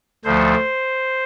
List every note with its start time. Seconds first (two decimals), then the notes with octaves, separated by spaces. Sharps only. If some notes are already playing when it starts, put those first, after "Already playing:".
0.25 D2 D3 F3 A3 C5